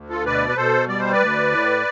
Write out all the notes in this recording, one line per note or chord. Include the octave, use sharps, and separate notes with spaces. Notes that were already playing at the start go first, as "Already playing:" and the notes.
Already playing: D2
F4 A4
B2 B4 D5
B4
B2 A4 C5
G3 D5
C5
B4 D5
D2
A2